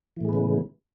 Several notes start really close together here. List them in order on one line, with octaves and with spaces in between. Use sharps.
E3 A2 G#3 B3 C#3